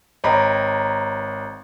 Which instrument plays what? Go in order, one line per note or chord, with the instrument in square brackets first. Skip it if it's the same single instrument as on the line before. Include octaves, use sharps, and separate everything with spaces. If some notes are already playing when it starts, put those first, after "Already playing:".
[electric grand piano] G#1 A#5 B5 [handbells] C#5 D#5 G5